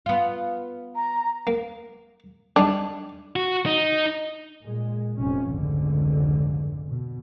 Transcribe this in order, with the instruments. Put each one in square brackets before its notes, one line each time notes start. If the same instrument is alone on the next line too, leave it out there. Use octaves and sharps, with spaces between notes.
[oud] B3 F4
[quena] A#5
[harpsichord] A#3
[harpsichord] D3 G3 D#4 [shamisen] D4
[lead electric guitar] F#4
D#4
[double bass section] A#2 G#3
F1 C3 F3 C#4
F1 C#2 G#2 D3
B2